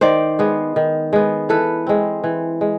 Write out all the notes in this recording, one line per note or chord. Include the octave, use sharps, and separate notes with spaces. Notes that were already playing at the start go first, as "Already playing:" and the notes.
D#3 C5 D5
G#3 B3
D#3
G#3 B3
E3 A4 B4
G#3 C4
E3
G#3